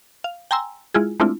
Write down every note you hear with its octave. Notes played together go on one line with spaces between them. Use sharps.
F5
G5 G#5 A#5 C6 E6
G#3 E4 F4 G#4
G#3 A3 C4 D4 E4 F4